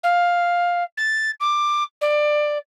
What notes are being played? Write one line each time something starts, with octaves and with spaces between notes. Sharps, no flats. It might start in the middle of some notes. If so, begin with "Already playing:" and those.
F5
A6
D6
D5